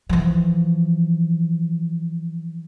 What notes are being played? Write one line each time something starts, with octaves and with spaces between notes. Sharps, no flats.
E3 F3